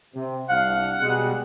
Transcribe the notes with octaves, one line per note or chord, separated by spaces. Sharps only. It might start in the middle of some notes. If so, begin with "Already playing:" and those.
C3
C2 D4 F5 F#5
B2 G3 G#3